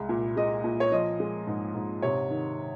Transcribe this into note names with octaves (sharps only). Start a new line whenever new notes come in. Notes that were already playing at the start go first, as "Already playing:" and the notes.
Already playing: C2 G#3
A#2
G#3 D#5
A#2
C#5
F3 D#5
G#3
G#2
G#2
C3 C#5
D#3